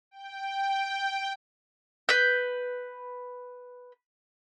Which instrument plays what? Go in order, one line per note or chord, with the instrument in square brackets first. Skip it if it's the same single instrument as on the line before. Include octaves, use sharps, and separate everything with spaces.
[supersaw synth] G5
[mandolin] B4 G6